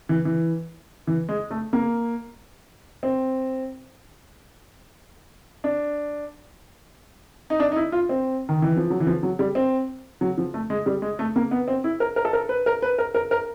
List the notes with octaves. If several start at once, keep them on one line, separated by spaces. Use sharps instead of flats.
E3
E3
E3
G#3
A3
A#3
C4
D4
D#4
D4
D#4
E4
F4
C4
D#3
E3
F3
F#3
E3
F3
F#3
G3
C4
F#3
F3
A3
G#3
G3
G#3
A3
A#3
B3
C4
E4
A#4
A#4
A4
A#4
B4
A#4
B4
A#4
A#4
A#4